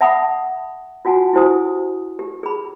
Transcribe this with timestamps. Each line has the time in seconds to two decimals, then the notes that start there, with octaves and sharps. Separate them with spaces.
0.01 E5 F#5 A5 B5 D6 D#6
1.05 F4 F#4 F#5 G#5 A5
1.33 E4 F#4 G4 C5 G#5 D#6
2.19 G4
2.43 G#4 B5